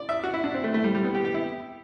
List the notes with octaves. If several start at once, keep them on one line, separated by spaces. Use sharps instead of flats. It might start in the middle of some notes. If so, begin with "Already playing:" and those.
Already playing: D5
E5
F#4
E4
D4
C4
A3
A3
G3
G3
B3
G4
G4
E4